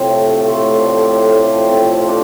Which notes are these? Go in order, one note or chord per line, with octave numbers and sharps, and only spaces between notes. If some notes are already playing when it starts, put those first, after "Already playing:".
Already playing: A2 C3 C4 F4
A3
A2
A3 F4
A3
A2 D5
C5
F3 D5
A3
D5
A2
A2 F5
F3 G4
F4
A3 C4
F3 C4
A3
D4